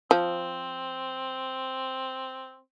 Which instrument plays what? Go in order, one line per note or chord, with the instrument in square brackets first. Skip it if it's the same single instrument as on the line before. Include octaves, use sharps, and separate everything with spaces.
[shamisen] F3 [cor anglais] C4